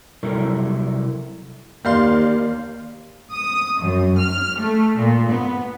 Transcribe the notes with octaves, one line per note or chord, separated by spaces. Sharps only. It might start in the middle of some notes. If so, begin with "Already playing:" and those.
C3 F#3 G3 E4 A4 A#4
D#2 A#3 G4 D5 F5 C6
D#6
F#2
F6
A3
A#2
B3